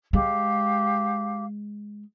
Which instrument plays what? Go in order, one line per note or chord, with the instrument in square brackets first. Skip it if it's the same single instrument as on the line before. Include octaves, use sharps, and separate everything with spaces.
[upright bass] G#3 [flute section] G4 F5